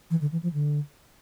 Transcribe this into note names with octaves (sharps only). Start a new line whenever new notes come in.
E3
D3
E3
F3
D3